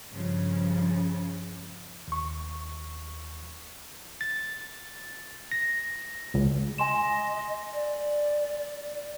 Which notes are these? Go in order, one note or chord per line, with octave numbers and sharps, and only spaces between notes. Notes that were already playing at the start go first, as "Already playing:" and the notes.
G2 C#3 F3
D#2 C#6
A6
A#6
C#2
D#5 G#5 C6 E7
D5